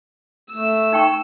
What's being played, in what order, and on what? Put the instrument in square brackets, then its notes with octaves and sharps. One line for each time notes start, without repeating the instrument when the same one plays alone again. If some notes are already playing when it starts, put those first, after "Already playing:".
[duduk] A3 [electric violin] E6
[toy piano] D#4 G5 C#6